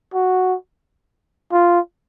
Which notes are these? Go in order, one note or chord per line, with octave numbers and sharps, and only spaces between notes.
F#4
F4